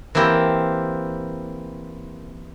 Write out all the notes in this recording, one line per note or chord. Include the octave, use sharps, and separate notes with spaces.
E3 A#3 C4 E4 G4 A#4